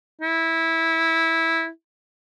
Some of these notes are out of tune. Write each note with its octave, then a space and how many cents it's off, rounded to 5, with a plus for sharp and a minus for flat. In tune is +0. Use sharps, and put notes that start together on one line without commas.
E4 -15